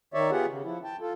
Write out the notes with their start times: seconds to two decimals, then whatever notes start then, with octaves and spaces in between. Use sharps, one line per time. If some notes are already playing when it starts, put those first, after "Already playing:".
0.14 D#3 C#5 D5 E5
0.31 B3 F4 G4 G#4 F#5
0.48 C#3
0.64 F3 E4
0.84 G5 A5
1.01 F4 A4